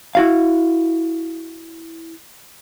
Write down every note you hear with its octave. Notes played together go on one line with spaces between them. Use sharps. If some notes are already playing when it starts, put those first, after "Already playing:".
E4 F#4 F5